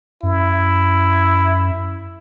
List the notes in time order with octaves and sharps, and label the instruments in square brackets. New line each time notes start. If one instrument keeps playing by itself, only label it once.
[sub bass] F#2 [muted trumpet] E4